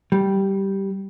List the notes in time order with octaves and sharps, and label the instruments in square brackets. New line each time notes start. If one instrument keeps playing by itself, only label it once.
[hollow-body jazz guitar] G3